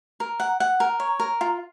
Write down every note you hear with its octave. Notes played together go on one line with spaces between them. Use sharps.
A#4
F#5
F#5
A#4
C#5
A#4
F4